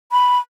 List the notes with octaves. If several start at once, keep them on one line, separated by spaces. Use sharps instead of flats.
B5